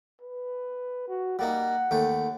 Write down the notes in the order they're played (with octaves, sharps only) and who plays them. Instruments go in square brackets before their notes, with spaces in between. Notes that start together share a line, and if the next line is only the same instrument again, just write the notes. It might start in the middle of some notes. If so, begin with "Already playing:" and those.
[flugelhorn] B4
F#4
[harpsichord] G3 A#3 D#4 [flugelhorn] F#5
[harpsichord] D#2 A3 G5